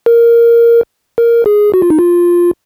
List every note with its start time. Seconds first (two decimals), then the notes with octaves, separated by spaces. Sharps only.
0.06 A#4
1.18 A#4
1.46 G#4
1.74 F#4
1.82 F4
1.90 D#4
1.99 F4